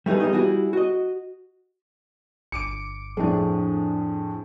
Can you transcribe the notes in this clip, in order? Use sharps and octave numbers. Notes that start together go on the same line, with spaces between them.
G3 A3 D#4 G#4 B4
E3 G3 B3 D#4 D#5
G3 E4 F#4 G#4
F#4 D#5
G1 D6 C#7 D7
F2 A2 D4 G#4